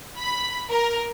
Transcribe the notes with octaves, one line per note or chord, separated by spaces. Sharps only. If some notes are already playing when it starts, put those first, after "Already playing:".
B5
A#4